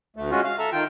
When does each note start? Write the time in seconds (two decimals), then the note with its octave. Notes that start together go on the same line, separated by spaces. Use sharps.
0.16 D2 A3
0.31 G#3 C#4 F4 F#4
0.45 F5
0.59 A4 E5 A#5
0.72 D#3 F4 G5